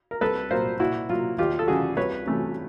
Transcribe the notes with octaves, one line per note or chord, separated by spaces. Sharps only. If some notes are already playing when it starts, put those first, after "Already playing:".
A#4
C2 A4 B4
A#2 F#3 A#3 A#4 C5
A#2 E4 F#4
F#3 A#3 F4
D#2 F4 G4
A4
C#3 E3 G3 F#4 G#4
C2 B4 C#5
C3 E3 A3 C#4